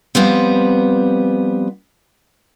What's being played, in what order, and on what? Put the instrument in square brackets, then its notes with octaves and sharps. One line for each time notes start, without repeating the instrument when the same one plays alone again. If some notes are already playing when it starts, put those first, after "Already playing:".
[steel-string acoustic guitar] F3 G3 B3 C4